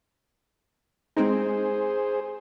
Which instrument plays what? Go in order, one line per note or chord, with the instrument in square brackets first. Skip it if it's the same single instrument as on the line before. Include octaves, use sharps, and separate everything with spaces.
[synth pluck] G#3 C4 D#4 [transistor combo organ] G#4 C5